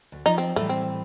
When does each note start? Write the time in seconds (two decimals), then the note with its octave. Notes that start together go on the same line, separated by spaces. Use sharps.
0.12 D2
0.26 F3 D#4
0.38 C4
0.56 A2 E3 G3 A3
0.69 C4